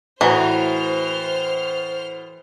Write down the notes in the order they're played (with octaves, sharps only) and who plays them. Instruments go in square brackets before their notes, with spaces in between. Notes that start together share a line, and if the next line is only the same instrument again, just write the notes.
[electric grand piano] A2 F#4 A#5 [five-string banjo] E3 [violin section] C5 F6